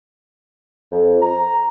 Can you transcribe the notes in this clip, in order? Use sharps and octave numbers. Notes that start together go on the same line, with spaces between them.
F2
A#5